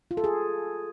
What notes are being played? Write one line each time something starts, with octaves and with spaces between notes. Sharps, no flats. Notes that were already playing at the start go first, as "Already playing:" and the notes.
F4
A4
G#4